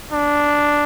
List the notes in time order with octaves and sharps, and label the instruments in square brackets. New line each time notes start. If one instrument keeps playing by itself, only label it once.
[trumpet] D4